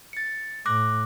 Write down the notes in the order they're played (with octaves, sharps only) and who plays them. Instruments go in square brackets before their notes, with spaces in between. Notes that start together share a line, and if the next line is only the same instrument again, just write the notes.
[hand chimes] A6 C#7
[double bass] A2 [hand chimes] D6 F#6 A#6